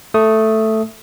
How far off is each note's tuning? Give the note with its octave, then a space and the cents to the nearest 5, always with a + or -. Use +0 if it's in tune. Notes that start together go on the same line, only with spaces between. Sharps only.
A3 +0 D#6 +10